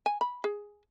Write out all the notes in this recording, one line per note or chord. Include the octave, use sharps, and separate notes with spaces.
G#5
B5
G#4